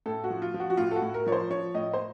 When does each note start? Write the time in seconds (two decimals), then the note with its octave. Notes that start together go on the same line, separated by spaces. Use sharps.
0.06 A2 A4
0.24 F#4
0.30 F3
0.42 F4
0.54 F3
0.60 F#4
0.70 F#4
0.77 A2 F4
0.91 A4
0.96 F#4
1.02 A2
1.14 A#4
1.26 F3 C#5
1.32 C5
1.50 F3 C#5
1.75 A2 D#5
1.93 C5